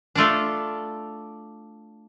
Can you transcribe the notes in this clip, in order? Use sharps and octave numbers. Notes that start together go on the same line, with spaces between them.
A3 D4 F4 A4 D5